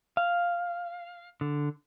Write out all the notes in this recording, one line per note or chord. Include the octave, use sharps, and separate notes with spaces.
F5
D3